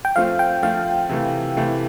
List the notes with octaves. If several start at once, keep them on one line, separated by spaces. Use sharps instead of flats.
G5
F3 A3 C4 F4 F5
G5
F3 A3 C4 F4 F5
C3 E3 A3
C3 E3 A3